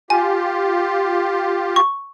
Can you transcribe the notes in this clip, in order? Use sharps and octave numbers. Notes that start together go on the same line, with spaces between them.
F4 G4 G#5
C#6